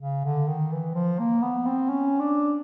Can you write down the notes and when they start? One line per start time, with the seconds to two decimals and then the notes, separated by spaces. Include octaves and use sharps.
0.01 C#3
0.25 D3
0.48 D#3
0.72 E3
0.95 F3
1.19 A#3
1.42 B3
1.66 C4
1.89 C#4
2.20 D4